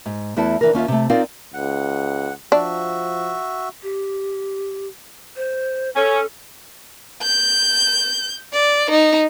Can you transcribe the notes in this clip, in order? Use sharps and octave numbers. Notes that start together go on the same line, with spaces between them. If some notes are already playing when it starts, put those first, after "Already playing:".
G#2
E2 A3 E4 F#4 A4
D3 E3 A#4
D#2 C#4 F4 E5
C3 A3
C4 D#4 F4 A#4 D5 F5
C#2 F#5
F3 D4 F#4 E5
G4
C5
C#4 A4
G6
D5
D#4